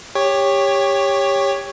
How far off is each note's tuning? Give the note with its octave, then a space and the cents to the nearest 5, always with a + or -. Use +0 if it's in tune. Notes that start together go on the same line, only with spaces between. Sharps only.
G4 +20 C#5 +0